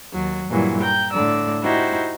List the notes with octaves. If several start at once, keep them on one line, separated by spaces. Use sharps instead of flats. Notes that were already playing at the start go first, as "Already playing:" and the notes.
D#2 F#3
G2 A#2 E3 F#3 G3
G5 A#5 G6
A2 D3 D5 E6
D#4 E4 F#4 G4 C5